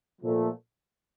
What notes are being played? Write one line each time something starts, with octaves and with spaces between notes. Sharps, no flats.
A#2 F3 A3